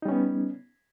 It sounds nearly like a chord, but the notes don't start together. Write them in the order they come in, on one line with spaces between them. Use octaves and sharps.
D#4 G3 C#4 B3